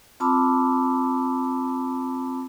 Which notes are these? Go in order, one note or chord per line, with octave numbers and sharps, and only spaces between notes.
C4 F4 A5 B5 D6 E6